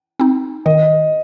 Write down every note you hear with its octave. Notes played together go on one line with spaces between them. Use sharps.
C4 D#4
D#3 D#5